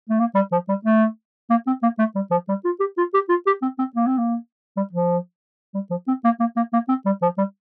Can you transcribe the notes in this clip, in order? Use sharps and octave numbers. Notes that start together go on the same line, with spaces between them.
A3
A#3
G3
F3
G3
A3
A#3
C4
A#3
A3
G3
F3
G3
F4
G4
F4
G4
F4
G4
C4
C4
A#3
C4
A#3
G3
F3
G3
F3
C4
A#3
A#3
A#3
A#3
C4
G3
F3
G3